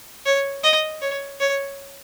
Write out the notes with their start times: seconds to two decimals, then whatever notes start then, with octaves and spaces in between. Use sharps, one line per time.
0.26 C#5
0.64 D#5
1.02 C#5
1.40 C#5